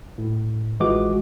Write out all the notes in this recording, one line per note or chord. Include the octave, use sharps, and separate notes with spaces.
A2
A1 E3 G#3 F4 F#4 D6